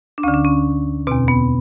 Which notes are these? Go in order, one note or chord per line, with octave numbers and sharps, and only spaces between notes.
D4
D2 D3 C#4
D4
C#4
E2 B2 C4
B3